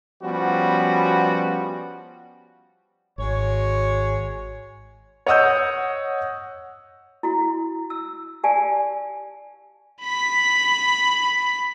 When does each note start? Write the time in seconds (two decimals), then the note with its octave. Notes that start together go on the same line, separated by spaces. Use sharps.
0.23 F3 G3 B3 C#4 F#4
3.18 G#1 G#3 F#4 C#5
5.27 C#5 D#5 F#5 D#6 E6 G6
7.23 E4 F#4
7.90 E6
8.44 G4 D5 F5 G#5 A5
10.01 B5 B6